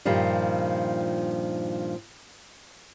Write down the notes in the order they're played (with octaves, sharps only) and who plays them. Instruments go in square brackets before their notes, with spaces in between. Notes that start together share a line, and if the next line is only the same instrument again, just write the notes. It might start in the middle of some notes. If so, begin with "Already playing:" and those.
[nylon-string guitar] G2 A#2 D#3 F3 G3